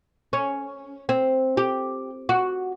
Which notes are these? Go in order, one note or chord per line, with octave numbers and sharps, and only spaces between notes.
C#4
C4
G4
F#4